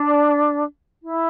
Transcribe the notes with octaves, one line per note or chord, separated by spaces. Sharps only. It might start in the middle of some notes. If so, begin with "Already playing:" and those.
Already playing: D4
E4